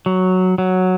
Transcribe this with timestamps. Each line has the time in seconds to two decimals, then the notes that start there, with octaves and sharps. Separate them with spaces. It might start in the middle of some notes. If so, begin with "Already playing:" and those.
0.06 F#3
0.58 F#3